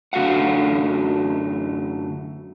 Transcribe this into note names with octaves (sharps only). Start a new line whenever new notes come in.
F#2 D3 A3 F#4 F5 F#5